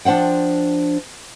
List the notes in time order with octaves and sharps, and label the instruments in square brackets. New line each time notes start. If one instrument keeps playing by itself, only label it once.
[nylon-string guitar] F3 D4 C5 F#5 G5